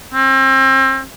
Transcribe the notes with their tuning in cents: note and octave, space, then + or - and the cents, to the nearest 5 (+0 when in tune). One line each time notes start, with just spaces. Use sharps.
C4 +35